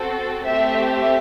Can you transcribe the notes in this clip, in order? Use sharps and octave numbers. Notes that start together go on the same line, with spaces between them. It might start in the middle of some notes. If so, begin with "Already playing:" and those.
Already playing: C4 F#4 A4
A3 C4 G4 E5
E5